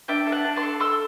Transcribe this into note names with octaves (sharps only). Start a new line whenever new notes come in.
D4 E5 G5
A4
F#5 A5
D4
A5 C6
A4
A4 C6 E6